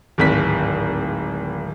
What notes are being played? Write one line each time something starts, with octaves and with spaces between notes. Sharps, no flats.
D1 G#1 B6